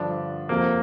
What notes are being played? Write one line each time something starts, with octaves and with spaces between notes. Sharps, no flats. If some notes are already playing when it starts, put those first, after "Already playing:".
Already playing: G2 D3 F3 D4
F2 C3 F3 A#3